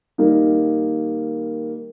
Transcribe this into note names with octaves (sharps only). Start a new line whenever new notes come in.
D#3 G3 A#3 D#4 G4